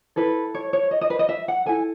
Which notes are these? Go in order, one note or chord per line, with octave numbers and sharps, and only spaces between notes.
E4 A4 B4
C#5
C#5
D#5
D#5
B4
D#5
E5
F#5
E4 A4 G#5